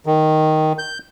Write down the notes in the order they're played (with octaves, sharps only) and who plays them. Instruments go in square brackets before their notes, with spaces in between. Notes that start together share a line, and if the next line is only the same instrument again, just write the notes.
[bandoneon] D#3
G6